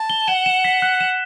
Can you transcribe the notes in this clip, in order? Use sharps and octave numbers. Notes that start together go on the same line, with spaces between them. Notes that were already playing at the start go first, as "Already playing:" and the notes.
Already playing: A5
G7
F#5 E7
E7
B6
F#6
E7